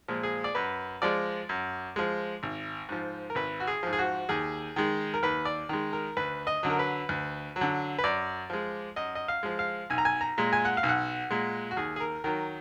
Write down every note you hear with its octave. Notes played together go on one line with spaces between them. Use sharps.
A#2 F3 G#3
G#4
D5
F#2 B4
F3 G#3 D5
F#2
F3 G#3
G#1
G#2 F3
A#4
G#1 B4
F#4
G#4
G#2 F3
G#4
F#4
D#2 G#4
D#3 G#3
A#4
D#2 B4
D5
D#3 G#3
A#4
D2 B4
D#5
D3 F#3
A#4
B4
D2
F#3
D3
B4
F#2 D5
F3 G#3
F#2 D#5
D#5
F5
F3 G#3
F5
B1 G#5
A#5
G#5
A#5
A#2 G#3
G#5
F#5
F5
B1
F#5
A#2 G#3
F#4
D#2 G#4
G#4
A#4
D#3 F#3 A#4